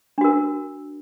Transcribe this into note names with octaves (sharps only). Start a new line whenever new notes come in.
D4 F#4 A#4